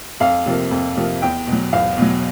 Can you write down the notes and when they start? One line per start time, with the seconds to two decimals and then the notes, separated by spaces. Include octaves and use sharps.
0.20 F2 F5
0.46 C3 F3 A#3
0.71 F2
0.97 C3 F3 A#3
1.22 E2 G5
1.47 B2
1.52 F#3
1.73 E2 F5
1.98 B2 F#3